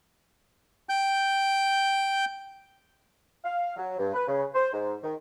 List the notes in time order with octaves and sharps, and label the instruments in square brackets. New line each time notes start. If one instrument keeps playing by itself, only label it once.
[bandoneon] G5 G6
[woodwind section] F5
F#3
G2
B4
C#3
C5
G#2
D#3